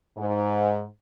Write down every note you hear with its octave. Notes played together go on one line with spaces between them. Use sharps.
G#2